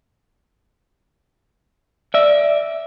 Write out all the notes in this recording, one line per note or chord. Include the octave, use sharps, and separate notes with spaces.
D5 E5